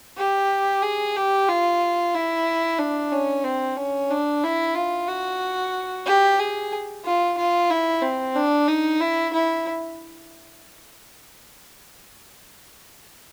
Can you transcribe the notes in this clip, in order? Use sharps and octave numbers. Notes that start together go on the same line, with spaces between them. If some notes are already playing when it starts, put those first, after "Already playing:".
G4
G#4
G4
F4
E4
D4
C#4
C4
C#4
D4
E4
F4
F#4
G4
G#4
F4
F4
E4
C4
D4
D#4
E4
E4